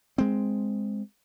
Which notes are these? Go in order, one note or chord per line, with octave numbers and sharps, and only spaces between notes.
G#3 C4